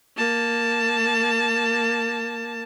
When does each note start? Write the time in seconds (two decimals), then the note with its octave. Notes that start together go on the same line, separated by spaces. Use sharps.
0.16 A#3 A5